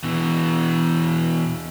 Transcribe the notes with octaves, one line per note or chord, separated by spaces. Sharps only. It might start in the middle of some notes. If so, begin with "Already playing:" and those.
B2 E3